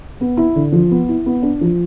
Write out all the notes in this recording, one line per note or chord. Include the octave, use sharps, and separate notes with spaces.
B3
E4
D3
F3
B3
E4
B3
D4
F3